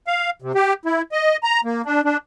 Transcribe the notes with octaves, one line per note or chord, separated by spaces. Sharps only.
F5
C3
G4
E4
D#5
A#5
A#3
D4
D4